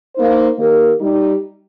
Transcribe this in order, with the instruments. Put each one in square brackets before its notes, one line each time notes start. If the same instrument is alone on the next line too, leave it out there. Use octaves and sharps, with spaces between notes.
[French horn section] A#3 D#4 C5
D#3 A#3 G4 A#4
G3 D#4 G4